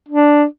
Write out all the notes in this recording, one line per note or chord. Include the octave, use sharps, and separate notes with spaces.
D4